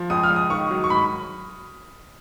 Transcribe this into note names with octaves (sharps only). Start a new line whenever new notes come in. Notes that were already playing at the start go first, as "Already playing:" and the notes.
Already playing: F3
C#2 D#6
F6
C#2
D#6
D#3 C#6
F#3
C#6
G#2 B5